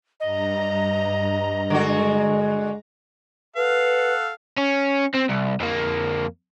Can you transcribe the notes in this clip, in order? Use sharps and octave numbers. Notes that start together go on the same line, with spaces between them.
G2 D#5 A#5
D3 G#3 F#4
A4 B4 F5 F#5
C#4
C4
C2
F2 A#3